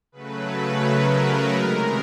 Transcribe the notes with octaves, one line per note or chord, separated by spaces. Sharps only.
C#3 F#3 A3 B4
A#4
C3 D#3 G#3